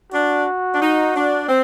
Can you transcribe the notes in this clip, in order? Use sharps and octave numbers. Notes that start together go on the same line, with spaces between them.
D4 F#4
D4
D#4
D4
C4